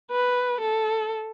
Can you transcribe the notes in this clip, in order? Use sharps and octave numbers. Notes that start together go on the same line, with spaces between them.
B4
A4